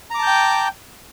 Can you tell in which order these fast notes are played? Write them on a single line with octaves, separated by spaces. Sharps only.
A#5 D6 A5 G6 G5